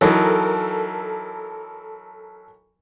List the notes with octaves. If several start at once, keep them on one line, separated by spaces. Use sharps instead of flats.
E3 F#3 D#4 A4 A#4